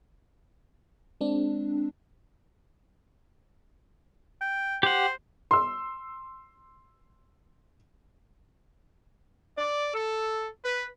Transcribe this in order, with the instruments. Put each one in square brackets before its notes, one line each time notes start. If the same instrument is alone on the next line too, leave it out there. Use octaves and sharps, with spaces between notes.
[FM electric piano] G#3 C4 D4
[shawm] G5
[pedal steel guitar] G4 F#5 [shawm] C5
[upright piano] C6 E6
[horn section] D5
A4
B4